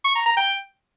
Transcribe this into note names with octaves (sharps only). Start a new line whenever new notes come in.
C#6
A#5
A#5
G5